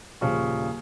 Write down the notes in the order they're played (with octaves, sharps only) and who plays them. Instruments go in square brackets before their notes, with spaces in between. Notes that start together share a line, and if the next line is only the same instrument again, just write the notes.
[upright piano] D#1 C#3 F3 C#6